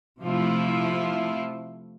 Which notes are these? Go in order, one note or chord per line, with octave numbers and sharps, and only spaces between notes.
C3 F3 A3 E4 F4